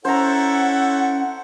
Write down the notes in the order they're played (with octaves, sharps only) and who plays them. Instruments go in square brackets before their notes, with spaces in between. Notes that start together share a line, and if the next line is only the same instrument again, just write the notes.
[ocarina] C#4 [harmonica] E4 A4 C#5 [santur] C5 A#5 [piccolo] F#5